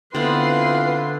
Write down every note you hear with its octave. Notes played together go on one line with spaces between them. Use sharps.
D3 B3 C4 E4 F4 B4 C6